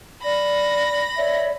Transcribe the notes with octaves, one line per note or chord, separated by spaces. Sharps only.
D5 B5 A#6
C#5 D5 E5